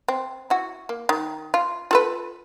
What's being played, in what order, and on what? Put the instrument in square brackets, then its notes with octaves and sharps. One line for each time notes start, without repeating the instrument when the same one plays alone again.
[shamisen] C4
E4 F#4
A#3
D#3
F4
F4 A4 B4